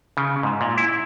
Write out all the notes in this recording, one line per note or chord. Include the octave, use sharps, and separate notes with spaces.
C#3
G#2
A#2
E4